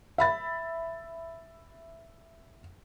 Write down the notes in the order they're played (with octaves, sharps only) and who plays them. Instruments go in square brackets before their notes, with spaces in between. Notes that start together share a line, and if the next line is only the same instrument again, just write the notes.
[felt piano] E5 B5 A6